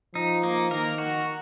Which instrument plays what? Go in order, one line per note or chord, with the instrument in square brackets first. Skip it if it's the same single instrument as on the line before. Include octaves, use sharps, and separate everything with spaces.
[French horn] F3 [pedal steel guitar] D#4
[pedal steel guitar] A#3
[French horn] D#3 [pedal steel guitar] A#4
[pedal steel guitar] F#4